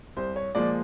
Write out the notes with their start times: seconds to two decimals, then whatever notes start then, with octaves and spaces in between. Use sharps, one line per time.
0.17 C2 C5
0.36 C#5
0.55 A#2 F3 G#3 D5